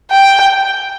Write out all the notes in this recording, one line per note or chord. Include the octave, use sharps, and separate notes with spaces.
G5